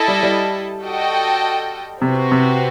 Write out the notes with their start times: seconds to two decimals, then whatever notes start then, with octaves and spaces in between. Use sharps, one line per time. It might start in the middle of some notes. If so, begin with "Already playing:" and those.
Already playing: E4 A4 D#5 A5
0.08 G3
0.23 G3
0.82 F#4 A4 D#5 G5
2.01 C3 C4 F#4 B4
2.31 C3